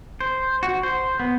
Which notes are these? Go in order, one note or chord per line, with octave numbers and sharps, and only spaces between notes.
C5
F#4
C5
B3